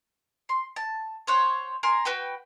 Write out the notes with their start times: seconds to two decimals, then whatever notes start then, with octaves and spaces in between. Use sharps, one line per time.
0.49 C6
0.76 A5
1.27 C5 C#5 F#5
1.83 A#4 G#5 C6
2.05 F#4 B4 G5